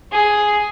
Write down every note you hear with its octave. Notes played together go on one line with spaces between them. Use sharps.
G#4